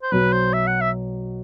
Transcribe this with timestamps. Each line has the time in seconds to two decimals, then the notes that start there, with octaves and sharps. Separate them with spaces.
0.03 C5
0.12 B1 B2 F#3 B4
0.33 C5
0.53 E5
0.67 F#5
0.81 E5